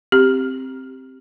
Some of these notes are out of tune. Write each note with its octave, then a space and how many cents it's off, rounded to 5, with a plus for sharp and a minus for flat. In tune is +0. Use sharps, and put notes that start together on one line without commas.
C4 +5 G4 +0